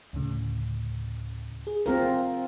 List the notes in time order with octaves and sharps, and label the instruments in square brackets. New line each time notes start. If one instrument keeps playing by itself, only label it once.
[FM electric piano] D2 A2 C#3
G#4
[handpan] C4 F4 A#4